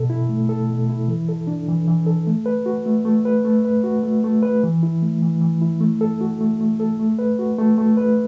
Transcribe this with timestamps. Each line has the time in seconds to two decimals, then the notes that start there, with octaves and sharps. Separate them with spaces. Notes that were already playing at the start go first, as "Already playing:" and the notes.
Already playing: B2 A4
0.10 E4
0.29 A3
0.49 A4
0.70 B2
0.89 E4
1.08 E3
1.29 A4
1.47 D4
1.68 E3
1.88 E3
2.06 A4
2.27 A3
2.46 B4
2.66 F#4
2.86 A3
3.05 A3
3.25 B4
3.45 A3
3.65 B4
3.84 F#4
4.03 A3
4.24 A3
4.43 B4
4.64 E3
4.83 E4
5.02 A3
5.22 E3
5.41 E3
5.62 E4
5.81 A3
6.01 A4
6.21 F#4
6.41 A3
6.61 A3
6.80 A4
6.99 A3
7.19 B4
7.39 F#4
7.58 A3
7.78 A3
7.97 B4